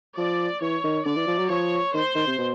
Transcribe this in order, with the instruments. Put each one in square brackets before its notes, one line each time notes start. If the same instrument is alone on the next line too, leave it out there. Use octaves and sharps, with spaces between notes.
[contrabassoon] F3 [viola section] D5
[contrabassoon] E3 [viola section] C#5
[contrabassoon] D#3
[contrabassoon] D3 [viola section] D5
[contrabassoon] E3
F3
F#3
[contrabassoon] F3 [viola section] C#5
[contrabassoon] D#3 [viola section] C5
[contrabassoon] D#3
C3
B2